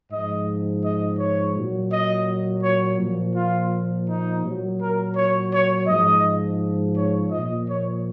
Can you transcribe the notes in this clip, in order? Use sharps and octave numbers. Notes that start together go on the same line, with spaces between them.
G#2 F3 D#5
D#5
C#5
A#2 F#3
D#5
C#5
A#2 F3
F4
D#4
A#2 F#3
A#4
C#5
C#5
G#2 F3 D#5
C#5
A#2 F3 D#5
C#5